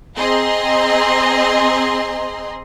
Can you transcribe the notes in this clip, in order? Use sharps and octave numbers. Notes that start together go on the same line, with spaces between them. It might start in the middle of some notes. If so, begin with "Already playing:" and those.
C4 G#4 D#5 A#5 C6